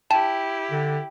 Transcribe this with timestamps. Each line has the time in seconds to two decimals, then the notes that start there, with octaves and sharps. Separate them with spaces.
0.11 E4 G4 G5 A5
0.71 D3